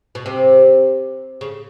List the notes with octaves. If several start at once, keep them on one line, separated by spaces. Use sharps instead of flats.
B2
C3
C#3